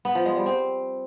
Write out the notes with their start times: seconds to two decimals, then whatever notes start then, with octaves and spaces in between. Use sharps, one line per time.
0.05 B3
0.15 F3
0.25 G#3
0.36 G3
0.46 C4